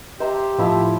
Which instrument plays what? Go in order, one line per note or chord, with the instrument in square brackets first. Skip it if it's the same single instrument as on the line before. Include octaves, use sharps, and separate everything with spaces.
[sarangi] G4 [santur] C5 E5 A#5
[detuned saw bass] A2 [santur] F3 E4